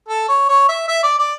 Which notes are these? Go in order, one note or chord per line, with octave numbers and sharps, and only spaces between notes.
A4
C#5
C#5
E5
E5
D5
D5